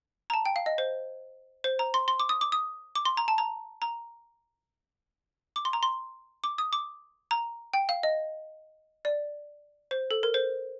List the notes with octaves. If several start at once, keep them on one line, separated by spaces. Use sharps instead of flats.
A#5
A5
G5
F5
D#5
C5
C5
A#5
C6
C6
D6
D#6
D6
D#6
D6
C6
A#5
A5
A#5
A#5
D6
C6
A#5
C6
D6
D#6
D6
A#5
G5
F5
D#5
D5
C5
A4
A#4
C5